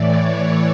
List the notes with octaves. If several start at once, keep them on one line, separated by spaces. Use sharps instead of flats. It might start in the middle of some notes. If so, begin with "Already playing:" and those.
Already playing: A2 E3 C#5 D5